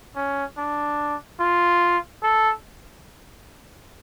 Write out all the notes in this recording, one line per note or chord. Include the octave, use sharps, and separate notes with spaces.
C#4
D4
F4
A4